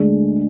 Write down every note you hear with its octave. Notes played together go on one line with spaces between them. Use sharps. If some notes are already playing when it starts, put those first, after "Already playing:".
Already playing: D2 D3 G#3 D4